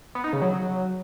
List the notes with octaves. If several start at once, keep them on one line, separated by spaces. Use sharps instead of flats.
B3
D#4
C#3
F#3